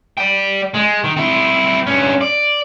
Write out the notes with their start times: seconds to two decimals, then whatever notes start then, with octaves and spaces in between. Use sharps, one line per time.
0.17 D5 G5
0.74 G#3
1.04 D#3
1.16 C4 E4
1.87 G2 C#4
2.21 D5